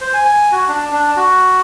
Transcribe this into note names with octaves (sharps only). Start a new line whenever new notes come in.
C5
G#5
G#5
F#4
D4
D4
F#4